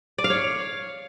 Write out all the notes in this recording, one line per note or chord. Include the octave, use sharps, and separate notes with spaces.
D5
F5
C#5